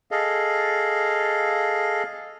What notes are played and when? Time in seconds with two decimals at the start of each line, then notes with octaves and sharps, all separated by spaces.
0.11 G#4 A4 D#5 F5